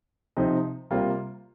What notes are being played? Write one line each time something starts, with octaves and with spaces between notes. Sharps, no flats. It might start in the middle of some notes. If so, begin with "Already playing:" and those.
C3 F3 C4 D#4
C3 G3 A#3 F4